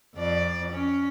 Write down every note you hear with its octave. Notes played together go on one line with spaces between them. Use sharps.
F2 D5
C#4